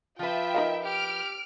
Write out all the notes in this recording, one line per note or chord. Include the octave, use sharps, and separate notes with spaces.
F3 F4 B4 E5 G5
D#4 A#4 F5
G4 F6 D7